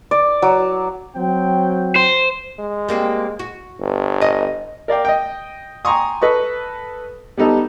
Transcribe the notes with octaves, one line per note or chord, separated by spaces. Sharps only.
D5
F#3
F#3 C4 G5
C5
G#3
G3 A#3 C4
F#4
G1
D#5
A#4 D5 F5 G5
D#5 G5
G5 G#5 A#5 C6 C#6 D#6
A4 B4 D#5 C#6
G3 B3 D#4 A4